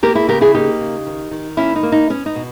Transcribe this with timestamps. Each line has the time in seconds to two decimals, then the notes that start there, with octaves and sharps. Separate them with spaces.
0.03 A#3 G4 A#4
0.15 E4 G#4
0.28 C#3 G4 A#4
0.41 E4 G#4
0.54 A#3 D#4 G4
0.80 C#3
1.07 D#3
1.31 D#3
1.57 A#3 C#4 E4
1.76 D#4
1.83 A#3
1.92 D#4
2.10 B3 C#4
2.26 D#4
2.36 B2